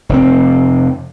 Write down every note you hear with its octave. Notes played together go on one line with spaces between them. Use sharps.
F1 A2 C4